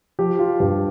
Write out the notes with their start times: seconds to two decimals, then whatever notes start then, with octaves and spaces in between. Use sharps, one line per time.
0.19 F3 G4
0.39 F4
0.60 G2 G4